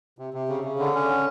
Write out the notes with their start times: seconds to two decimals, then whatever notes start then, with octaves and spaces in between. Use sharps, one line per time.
0.19 C3
0.34 C3
0.49 C#3
0.64 C#3
0.79 D3
0.95 C#4